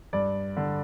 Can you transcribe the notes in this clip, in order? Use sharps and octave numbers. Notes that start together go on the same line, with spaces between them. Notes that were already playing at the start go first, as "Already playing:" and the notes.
G2 D5
D3